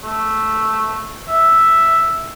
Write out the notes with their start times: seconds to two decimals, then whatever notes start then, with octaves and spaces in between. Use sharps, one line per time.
0.03 A3
1.28 E5